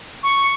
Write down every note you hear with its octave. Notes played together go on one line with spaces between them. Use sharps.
C#6